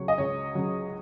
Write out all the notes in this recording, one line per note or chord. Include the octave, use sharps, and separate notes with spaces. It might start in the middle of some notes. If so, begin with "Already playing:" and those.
Already playing: C#2 C#3 F#3 C#5
D#5
C#2 C#5
C#3 F#3